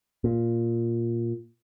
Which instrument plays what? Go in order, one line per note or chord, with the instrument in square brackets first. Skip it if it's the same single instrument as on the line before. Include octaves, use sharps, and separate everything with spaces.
[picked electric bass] A#2